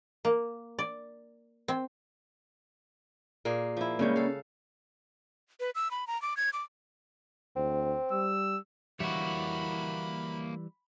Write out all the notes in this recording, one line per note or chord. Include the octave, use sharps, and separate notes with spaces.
A#3
D5
C4
A#2 A#3 G#4
F3 E4
C#3 G3 G#3 A#3 C#4 G4
A4 F5
B4
E6
B5
A#5
D6
G#6
D6
D2 C4
G3 E6
E3 G3 A#3 E4 F#4 C#5 B5